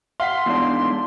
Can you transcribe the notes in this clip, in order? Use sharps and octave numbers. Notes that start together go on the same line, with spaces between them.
F5 F#5 C6 B6
E2 G#2 D4